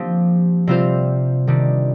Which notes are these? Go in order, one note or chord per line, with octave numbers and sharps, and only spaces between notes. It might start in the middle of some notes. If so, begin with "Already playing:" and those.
Already playing: F3 A#3 C4 D4 G4
C3 G3 C4 F4 C5
C3 D#3 G3 D4